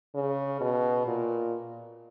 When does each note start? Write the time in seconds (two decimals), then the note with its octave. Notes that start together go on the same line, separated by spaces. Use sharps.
0.15 C#3
0.61 B2
1.06 A#2